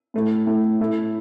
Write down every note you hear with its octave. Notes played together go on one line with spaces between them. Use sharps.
A2 A3 E4
A2 A3 E4
A2 A3 E4